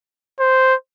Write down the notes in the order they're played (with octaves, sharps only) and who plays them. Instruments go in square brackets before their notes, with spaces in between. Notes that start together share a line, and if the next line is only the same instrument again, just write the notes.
[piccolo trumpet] C5